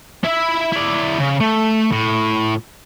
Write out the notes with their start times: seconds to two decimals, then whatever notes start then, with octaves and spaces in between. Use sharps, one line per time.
0.24 E4 E5
0.72 E4 D5
1.19 C#3
1.40 A3
1.92 A2